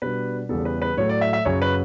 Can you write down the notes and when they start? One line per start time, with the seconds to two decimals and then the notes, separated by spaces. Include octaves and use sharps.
0.02 B2 G3 D4 B4
0.49 E2 C#3 E3 G3 B3 A4
0.65 B4
0.82 B4
0.97 A2 F#3 A3 C#5
1.09 D5
1.21 E5
1.33 E5
1.45 F#2 C#3 F#3 C#5
1.62 B4